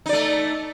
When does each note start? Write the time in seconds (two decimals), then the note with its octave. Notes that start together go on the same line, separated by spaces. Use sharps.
0.06 D#4
0.09 D5
0.13 A3